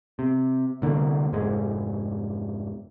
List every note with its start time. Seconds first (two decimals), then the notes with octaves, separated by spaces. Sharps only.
0.19 C3
0.82 C2 D3 A#3
1.33 F1 G#2 G#3